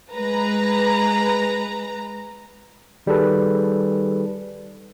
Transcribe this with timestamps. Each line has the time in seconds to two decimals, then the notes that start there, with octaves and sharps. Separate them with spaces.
0.13 G#3 B4 A#5
3.06 D#3 G3 D#4 G#4 A4 B4